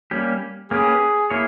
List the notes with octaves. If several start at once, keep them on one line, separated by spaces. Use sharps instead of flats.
G3 A#3 C#4 G4
A#3 C#4 G4 G#4 B4
A#3 E4 G#4 C#5